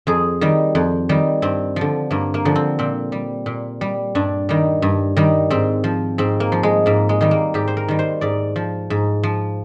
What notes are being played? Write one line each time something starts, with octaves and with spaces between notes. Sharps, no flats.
F2 G#4
D#3 G3
F2
D#3 G3
G2 C4
D3 F3
G2 A#3
A#3
D3 F3
C4
A#2 C4
G3
A#2
G3
G2 D4
D#3 G3
G2
D#3 G3
G#2 C4
F3
G#2 C4
A#3
F3
G#3
G#2 A#3
G#3
D#3 G3
A#3
G#2 G4
C5
A#4
D#3 G3
C5
G#2 D5
F3
G#2
F3